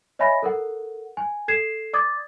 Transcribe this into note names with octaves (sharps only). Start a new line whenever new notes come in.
C#5 D#5 E5 G#5 B5 A#6
A4 A#4 F#5
G#5
A4 G#6 C7 E7
D5 D6 D#6 G#6 A6